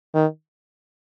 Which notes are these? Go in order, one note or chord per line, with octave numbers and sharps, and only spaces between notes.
D#3